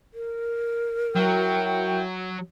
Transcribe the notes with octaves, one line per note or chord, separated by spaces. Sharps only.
A#4
F#3 E4 F#4 G5